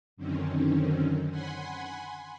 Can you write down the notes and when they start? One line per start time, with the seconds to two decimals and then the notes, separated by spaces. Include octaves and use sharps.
0.17 F#2 D3 D#3 C4 C#4
1.30 F#5 G#5 B5 C6